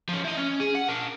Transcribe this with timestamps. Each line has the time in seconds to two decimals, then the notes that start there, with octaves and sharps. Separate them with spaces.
0.09 F3 C#4
0.25 E4 D#5
0.38 C#4
0.60 G#4
0.75 F#5
0.89 D4 A#4